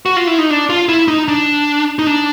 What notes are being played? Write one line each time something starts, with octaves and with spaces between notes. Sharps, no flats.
F#4
F4
E4
D#4
D4
F4
E4
D#4
D4
D#4
D4